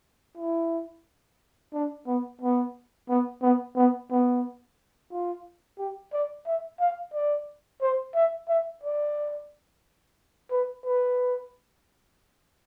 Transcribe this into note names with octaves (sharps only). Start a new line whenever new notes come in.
E4
D4
B3
B3
B3
B3
B3
B3
F4
G4
D5
E5
F5
D5
C5
E5
E5
D5
B4
B4